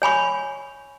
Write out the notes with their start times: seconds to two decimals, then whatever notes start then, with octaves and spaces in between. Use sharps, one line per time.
0.02 C#5 G#5 B5 C#6